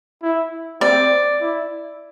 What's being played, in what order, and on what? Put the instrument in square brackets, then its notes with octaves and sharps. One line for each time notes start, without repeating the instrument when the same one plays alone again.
[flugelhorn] E4
[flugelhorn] C4 [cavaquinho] D5
[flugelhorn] E4